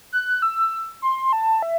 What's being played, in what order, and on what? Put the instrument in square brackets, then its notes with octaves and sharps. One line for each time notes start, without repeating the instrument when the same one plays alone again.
[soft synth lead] F#6
E6
C6
A5
E5